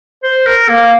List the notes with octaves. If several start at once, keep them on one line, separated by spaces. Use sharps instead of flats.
C5
A#4
A#3